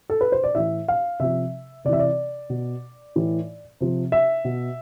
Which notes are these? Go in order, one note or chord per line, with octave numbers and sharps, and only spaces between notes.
A4
B4
C5
D5
A2 E3 E5
F5
C3 F3 E5
C3 E3 D5 E5
D5
B2
A2 E3
C3 F3
E5
B2